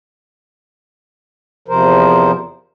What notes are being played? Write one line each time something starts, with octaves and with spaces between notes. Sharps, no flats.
E2 C3 F3 A#4 C5